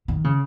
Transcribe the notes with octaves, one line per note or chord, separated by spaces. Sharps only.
D#3
C#3